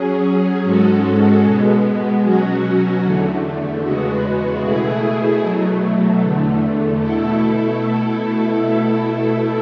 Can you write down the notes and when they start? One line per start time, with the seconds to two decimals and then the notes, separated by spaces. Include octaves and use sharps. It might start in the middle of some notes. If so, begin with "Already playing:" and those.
Already playing: F#3 C#4 G#4
0.64 G#2 G#3 C#4 F#4 A4
1.44 B2 G#3 B3
2.23 B2 F#3 C#4 F#4
3.04 E2 D3 A3
3.83 E2 C#3 G#3 B3 F#4
4.62 B2 A3 E4 G#4
5.42 B2 F#3 A3
6.21 E2 D3 A3
7.00 B2 A3 E4 A4